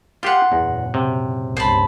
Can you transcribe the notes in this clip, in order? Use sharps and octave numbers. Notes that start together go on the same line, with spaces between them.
F4 G4 F#5 C6
F#1 E2 A#2
C3
G1 C#2 C5 A5 B5